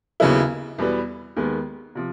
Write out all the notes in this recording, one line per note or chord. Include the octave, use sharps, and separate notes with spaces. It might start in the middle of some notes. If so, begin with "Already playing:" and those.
D#2 C#3 F#3 B3 E4
E2 B2 G3 B3
D#2 D#3 G#3 B3
C3 F3